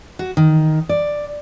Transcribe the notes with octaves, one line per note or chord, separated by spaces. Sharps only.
F#4
D#3
D5